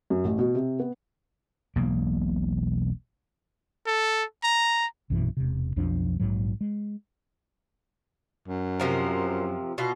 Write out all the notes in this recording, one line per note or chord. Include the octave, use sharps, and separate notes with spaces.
F#2
A1
B2
C3
B3
E1 B1 A#3
A4
A#5
A#1 F#2 B2 E3
E1 C3
B1 F2 F3 D4
A#1 F2 G#2 F#3
G#3
F#2
C3 F3 A#4
B2 F4